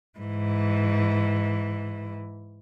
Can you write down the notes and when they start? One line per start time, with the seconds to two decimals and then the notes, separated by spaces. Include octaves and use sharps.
0.19 G#2 E3